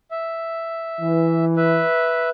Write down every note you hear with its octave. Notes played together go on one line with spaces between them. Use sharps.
E5
E3
B4 E5